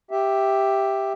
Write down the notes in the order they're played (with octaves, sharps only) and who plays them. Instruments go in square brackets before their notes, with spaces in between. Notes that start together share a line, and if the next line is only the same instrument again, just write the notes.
[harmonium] G4 E5